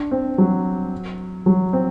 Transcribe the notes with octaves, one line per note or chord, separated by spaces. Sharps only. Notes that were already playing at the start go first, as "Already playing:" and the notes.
Already playing: D4
C4
F#3
F#3
C4